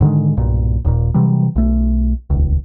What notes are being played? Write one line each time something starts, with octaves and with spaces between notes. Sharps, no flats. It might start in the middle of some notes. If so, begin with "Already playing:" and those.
G#2 D3 D#3 G#3
B1 G2 A#2
D#1 D#2 A#2
C3 E3 F#3 G3
B1 A3
D#1 C#2